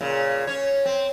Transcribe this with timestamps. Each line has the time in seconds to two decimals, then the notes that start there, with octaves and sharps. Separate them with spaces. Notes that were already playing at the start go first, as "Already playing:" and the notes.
0.01 A#2 C#3
0.47 C#4 C#5
0.86 C4